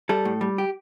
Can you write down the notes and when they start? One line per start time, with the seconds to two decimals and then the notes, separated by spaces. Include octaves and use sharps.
0.09 G3 A4
0.25 A2
0.41 G3
0.58 G4